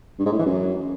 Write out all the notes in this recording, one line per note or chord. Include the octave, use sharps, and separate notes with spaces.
G2
G#2
A2
E3
F#2